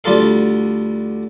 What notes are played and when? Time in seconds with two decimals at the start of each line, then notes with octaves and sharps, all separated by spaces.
0.04 D2 G3 F4 A4 F5